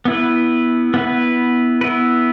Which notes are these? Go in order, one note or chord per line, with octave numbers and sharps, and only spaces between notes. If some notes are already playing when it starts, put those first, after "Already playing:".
B3 E4 B4
B3 E4 B4
B3 E4 B4